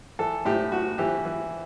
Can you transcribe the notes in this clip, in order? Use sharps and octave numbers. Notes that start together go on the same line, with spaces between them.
E3 A4
A2 G4
A2 F#4
E3 G4
E3